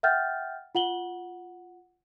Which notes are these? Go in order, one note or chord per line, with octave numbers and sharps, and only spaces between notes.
E5 F#5 G5 F6 G6 A6
F4 F#5 F#7 G7